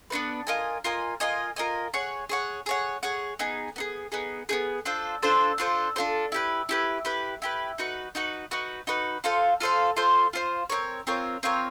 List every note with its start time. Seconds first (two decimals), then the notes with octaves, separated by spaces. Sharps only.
0.10 B3 D4 F#4 B4
0.47 F4 A#4 D#5 G#5
0.84 F4 A#4 D#5 G#5
1.20 F4 A#4 D#5 G#5
1.56 F4 A#4 D#5 G#5
1.94 G#4 C#5 F#5
2.29 G#4 C#5 F#5
2.66 G#4 C#5 F#5
3.03 G#4 C#5 F#5
3.39 B3 D#4 G#4
3.76 B3 D#4 G#4
4.12 B3 D#4 G#4
4.49 B3 D#4 G#4
4.85 D4 F4 A4 C5
5.22 D4 F4 A4 C5
5.58 D4 F4 A4 C5
5.96 D4 F4 A4 C5
6.32 E4 G4 B4
6.69 E4 G4 B4
7.05 E4 G4 B4
7.42 E4 G4 B4
7.78 D#4 F#4 B4
8.15 D#4 F#4 B4
8.51 D#4 F#4 B4
8.87 D#4 F#4 B4
9.24 F4 A4 C5 F5
9.60 F4 A4 C5 F5
9.96 F4 A4 C5 F5
10.33 F4 A4 C5 F5
10.70 C4 F4 A#4 C#5
11.07 C4 F4 A#4 C#5
11.43 C4 F4 A#4 C#5